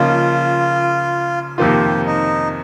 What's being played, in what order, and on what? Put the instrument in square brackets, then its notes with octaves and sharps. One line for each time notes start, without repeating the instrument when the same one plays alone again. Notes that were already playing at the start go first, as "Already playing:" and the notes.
Already playing: [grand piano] C#3 F3 A#3 D#4 [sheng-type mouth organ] F4
[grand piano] F2 C3 D#3 A#3 F4 [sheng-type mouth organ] G4
[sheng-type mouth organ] D#4